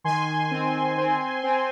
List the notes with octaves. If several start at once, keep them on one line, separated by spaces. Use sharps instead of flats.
D#3 G#5 C6
C4
C4
C4